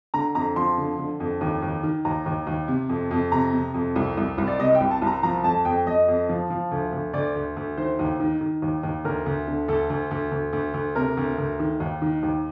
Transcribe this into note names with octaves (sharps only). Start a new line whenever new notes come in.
D3 A#5
F2 A#5
F3 C6
D3
D3
F2
D#2
D#2
D#3
D#2 A#5
D#2
D#2
C3
F2
F2
C3 A#5
C3
F2
C2
C2
C2
D5
C3 D#5
G5
C2
A5
C2
A#5
F3 A#5
F2 A5
F2 G5
F2 D#5
F2
F3
F3
D2
D2
D2 D5
D2
D2
D#3 C5
D#2
D#3
D#3
D#2
D#2
D2 A#4
D2
D3
D2 A4
D2
D2
D2
D2
D2
C3 A#4
D2
D2
D#3
D#2
D#3
D#2